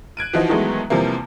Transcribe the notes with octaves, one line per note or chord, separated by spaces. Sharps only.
F#6 G#6 D7 D#7
E3 F3 D#4 F#4
D#3 E3 F#3 G#3 A3 B3
E2 C3 F3 G3 A#3